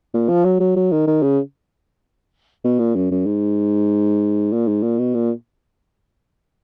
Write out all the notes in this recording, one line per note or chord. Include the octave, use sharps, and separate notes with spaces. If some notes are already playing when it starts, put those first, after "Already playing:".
A#2
F3
F#3
F#3
F#3
D#3
D#3
C#3
B2
A#2
F#2
F#2
G#2
A#2
G#2
A#2
B2
A#2